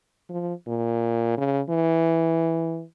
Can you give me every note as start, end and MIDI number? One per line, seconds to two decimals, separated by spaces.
0.29 0.53 53
0.67 1.33 46
1.37 1.60 49
1.70 2.83 52